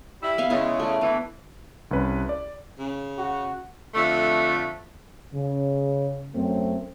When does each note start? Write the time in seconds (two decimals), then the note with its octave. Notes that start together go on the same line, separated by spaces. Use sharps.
0.22 G3 E4
0.38 B3 E5 F5
0.50 C#3 G#3 B3 E4
0.80 A3 D5
1.01 D3 E3 B3
1.91 C2 C#4 B4 B5
2.29 D5
2.79 C#3
3.18 F#4
3.94 F2 D3 A3
5.33 C#3
6.35 F#2 A3 C4